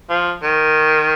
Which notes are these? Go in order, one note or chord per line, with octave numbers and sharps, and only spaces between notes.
F3
D#3